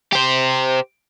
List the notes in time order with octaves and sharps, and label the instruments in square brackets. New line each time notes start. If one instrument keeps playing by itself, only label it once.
[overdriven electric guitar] G4 C5